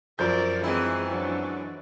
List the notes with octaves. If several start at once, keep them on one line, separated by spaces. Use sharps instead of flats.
F#2 F3 A#4 D5 G6
E3 G#3 C4 E4 G#4
F#3 D4